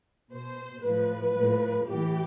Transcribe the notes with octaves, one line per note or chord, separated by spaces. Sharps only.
B2 C5
A2 F3 B4
A2 F3
A2 E3 G4